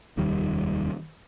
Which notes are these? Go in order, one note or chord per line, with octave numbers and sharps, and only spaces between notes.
F1 D#2 D#3 G3